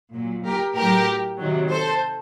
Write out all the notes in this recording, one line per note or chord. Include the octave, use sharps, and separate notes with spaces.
A#2 F#3
G4 A#4
A2 F#3 G4 A#4
C3 D#3 F#3
A4 C5